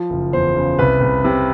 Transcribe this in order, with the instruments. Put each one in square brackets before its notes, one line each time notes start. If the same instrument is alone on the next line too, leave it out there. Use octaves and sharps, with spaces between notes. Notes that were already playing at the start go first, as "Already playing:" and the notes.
Already playing: [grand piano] F3
F#1
E2 C5
C#3
C2 B4
C2
C3